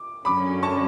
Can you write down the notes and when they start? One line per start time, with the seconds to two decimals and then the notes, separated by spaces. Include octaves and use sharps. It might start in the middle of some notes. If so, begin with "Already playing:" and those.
Already playing: D6
0.25 F#2 D3 F#3 C#4 B5 D6
0.63 A5 C#6